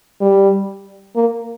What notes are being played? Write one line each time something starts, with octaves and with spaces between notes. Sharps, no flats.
G3
A#3